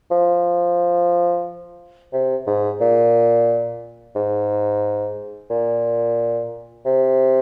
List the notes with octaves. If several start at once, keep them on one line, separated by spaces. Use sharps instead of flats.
F3
C3
G#2
A#2
G#2
A#2
C3